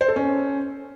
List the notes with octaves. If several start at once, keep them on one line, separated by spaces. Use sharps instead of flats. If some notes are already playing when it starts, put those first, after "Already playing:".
C5
A4
C#4